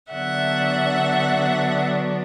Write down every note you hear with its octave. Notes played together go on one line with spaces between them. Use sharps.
D3 F#3 B3 D4 E5 F#5